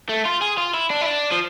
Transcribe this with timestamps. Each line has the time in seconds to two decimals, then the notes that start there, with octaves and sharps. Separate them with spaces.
0.09 A3
0.25 F4
0.41 G#4
0.58 F4
0.74 E4
0.90 D4
1.01 E4
1.06 D4
1.32 F3